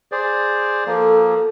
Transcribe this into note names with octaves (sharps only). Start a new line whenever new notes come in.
G#4 C5 D5
F3 A#3 A4